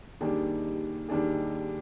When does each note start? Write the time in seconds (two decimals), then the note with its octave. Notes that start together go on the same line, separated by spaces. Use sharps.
0.21 D#2 D#3 G3 D4 G#4
1.09 D#2 D#3 G3 D4 G#4